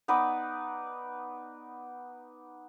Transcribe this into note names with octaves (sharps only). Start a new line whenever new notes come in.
B3 D#4 B4 D5